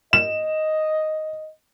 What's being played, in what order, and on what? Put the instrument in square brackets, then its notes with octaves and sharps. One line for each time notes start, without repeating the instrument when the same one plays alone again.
[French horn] D#5 [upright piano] E7